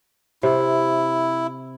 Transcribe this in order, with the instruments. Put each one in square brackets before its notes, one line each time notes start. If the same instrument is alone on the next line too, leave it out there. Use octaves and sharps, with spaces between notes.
[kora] C3 [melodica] E4